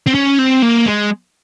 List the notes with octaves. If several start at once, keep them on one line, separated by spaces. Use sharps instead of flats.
C4
C#4
C4
A#3
G#3